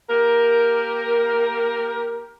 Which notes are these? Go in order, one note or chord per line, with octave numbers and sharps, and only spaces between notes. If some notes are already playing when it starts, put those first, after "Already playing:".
A#3 G4 A#4